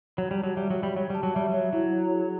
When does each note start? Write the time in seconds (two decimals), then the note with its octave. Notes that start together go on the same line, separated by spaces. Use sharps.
0.17 F#3 C#5
0.31 G3
0.37 A5
0.44 F#3
0.56 G3 E5
0.70 F#3
0.76 C#5
0.83 G3
0.95 F#3 C#5
1.10 G3 A5
1.23 F#3
1.34 G3 E5
1.49 F#3 C#5
1.73 F#3 E4
1.92 C#5
2.12 G#4